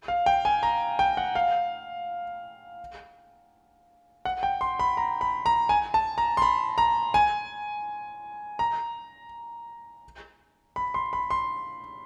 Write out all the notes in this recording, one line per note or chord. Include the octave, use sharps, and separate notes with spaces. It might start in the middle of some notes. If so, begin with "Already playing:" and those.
F5
G5
G#5
A#5
G5
F#5
F5
F#5
G5
C6
B5
A#5
B5
A#5
G#5
A5
A#5
C6
B5
A#5
G#5
A#5
B5
C6
B5
C6